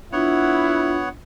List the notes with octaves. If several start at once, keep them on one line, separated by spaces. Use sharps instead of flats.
B3 D4 E4 F4 C#5 F#5